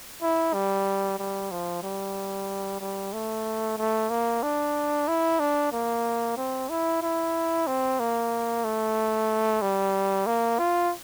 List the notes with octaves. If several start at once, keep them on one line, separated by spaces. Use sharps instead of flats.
E4
G3
G3
F3
G3
G3
A3
A3
A#3
D4
E4
D4
A#3
C4
E4
E4
C4
A#3
A3
G3
A#3
F4